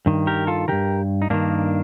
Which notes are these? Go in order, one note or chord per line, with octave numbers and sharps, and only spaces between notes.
G2 D#3
G4 A#4
F4 A4
G2 D#3 G4 A#4
D#4
G2 D#3 A#3 D4